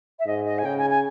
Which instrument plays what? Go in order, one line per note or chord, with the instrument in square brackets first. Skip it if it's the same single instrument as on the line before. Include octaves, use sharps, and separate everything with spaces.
[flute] E5
[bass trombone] G#2 [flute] D#5
[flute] D#5
G#5
[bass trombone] C#3 [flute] G5
[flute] G#5
G#5